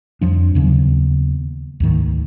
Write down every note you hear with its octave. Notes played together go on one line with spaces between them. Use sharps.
F2 F3 D4
D#2 C#3 F#3 B3
D2 G#2 D#3